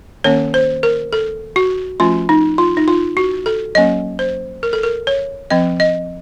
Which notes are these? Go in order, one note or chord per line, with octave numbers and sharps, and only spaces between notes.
D#3 A#3 C#4 C#5
C5
A#4
A4
F#4
F3 A3 C#4 F4
D#4
F4
D#4
F4
F#4
A4
F#3 A#3 C#4 D#5
C5
A#4
A4
A#4
C#5
F3 C4 D#5
D#5